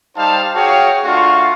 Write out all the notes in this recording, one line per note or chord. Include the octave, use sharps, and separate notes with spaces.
G3 D#4 C5 F5 A5
F#4 G#4 C#5 F5 G5
A3 D4 F4 F#4 F5 C#6